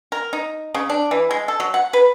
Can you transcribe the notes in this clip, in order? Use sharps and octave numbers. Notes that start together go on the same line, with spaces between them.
A#4
D#4
C#3
D4
E3
G#3
A4
F#3
F#5
B4